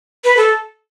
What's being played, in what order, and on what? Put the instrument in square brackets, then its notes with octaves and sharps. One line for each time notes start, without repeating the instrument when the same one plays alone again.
[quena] B4
A4